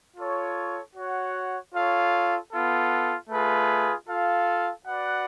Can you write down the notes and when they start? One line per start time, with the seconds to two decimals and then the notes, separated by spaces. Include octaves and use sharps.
0.17 F4 A4 C#5
0.96 F#4 C#5 F#5
1.75 F4 A4 C#5 F5
2.52 B3 F4 A4
3.30 A3 F4 G#4 B4
4.08 F4 A4 F5
4.86 F#4 B4 D5 F#5